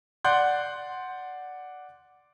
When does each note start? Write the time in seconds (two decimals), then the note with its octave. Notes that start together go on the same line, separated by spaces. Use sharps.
0.24 D5 F#5 C6 F#6 G6